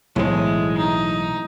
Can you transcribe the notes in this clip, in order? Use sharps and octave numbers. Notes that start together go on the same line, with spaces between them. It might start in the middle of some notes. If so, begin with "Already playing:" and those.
B1 A2 E3 G#3 C4
D#4